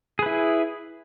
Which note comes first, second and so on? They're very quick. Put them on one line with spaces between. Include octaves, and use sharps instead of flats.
G#4 B4 E4